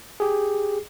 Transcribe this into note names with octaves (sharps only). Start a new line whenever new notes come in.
G4 G#4